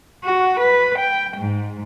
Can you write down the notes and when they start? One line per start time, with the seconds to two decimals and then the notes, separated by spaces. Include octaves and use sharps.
0.24 F#4
0.60 B4
0.98 G5
1.37 G#2